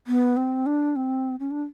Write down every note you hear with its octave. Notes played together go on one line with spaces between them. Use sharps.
B3
C4
D4
C4
C#4
D4